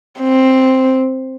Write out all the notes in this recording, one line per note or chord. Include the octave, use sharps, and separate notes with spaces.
C4